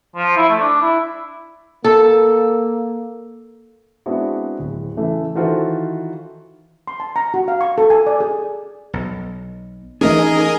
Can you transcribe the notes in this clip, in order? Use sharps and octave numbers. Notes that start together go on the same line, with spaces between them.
F3
E4
A3
D4
E4
A#3 A4
G#3 B3 C4 D4 E4 F#4
D1
C#3 E3 A3
D#3 E3 F4 F#4 A4 C5
C6
A5
A#5
F#4
F5
C#6
A4
G#5
D5
G#4
B1
E3 A3 C#4 D#4 G#4 A#4 D#5 G#5